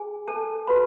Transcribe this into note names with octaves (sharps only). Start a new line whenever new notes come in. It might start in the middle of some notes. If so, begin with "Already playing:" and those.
Already playing: G#4 G#5
A4 A5
F#4 B4 B5